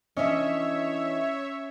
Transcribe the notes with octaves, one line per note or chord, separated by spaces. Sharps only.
E3 C#4 D4 C#5 D#5 E5